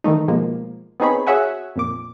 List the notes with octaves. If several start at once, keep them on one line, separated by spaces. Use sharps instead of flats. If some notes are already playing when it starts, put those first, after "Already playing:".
D#3 E3 A3 D#4
B2 F3 G#3 A#3
B3 C4 D#4 G#4 C#5 B5
F#4 G#4 C#5 E5 F#5 G#5
F2 A#2 D6